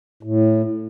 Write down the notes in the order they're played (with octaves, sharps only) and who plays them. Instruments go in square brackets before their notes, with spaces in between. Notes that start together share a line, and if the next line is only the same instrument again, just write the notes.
[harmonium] A2